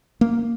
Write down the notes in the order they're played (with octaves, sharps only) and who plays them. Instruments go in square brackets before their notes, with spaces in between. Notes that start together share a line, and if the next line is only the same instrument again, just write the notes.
[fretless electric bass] A#3